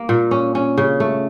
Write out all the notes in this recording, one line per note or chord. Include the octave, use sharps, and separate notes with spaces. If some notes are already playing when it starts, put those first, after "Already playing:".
Already playing: A#3
A#2
C#4
C#4
C#3
A3